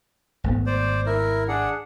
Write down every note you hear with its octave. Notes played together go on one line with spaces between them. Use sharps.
G#1 A3 B3
C5 D5
E4 A#4
D4 G#4 F#5